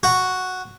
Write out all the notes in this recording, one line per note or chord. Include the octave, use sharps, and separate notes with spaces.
F#4